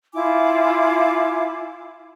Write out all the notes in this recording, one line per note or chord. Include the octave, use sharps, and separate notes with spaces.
E4 F4 G#5 D6